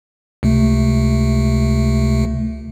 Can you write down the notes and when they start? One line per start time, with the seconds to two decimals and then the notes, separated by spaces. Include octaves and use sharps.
0.43 C#2 C3 A3